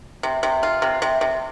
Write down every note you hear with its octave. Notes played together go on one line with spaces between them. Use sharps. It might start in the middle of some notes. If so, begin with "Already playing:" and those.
C3
C3
F4
C3
C3
C3